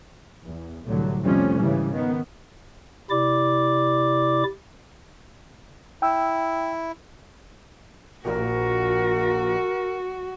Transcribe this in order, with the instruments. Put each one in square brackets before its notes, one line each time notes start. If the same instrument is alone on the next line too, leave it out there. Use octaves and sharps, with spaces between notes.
[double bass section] E2
C2 A2 D3 F#3
F2 C3 F3 G3 A3 C#4
G#2 C#3 E3 G3
D#3 B3
[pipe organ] C3 E4 D5 D6
[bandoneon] E4 [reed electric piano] G5 E6
[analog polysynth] A#1 A#2 [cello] F#4 [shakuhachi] A#4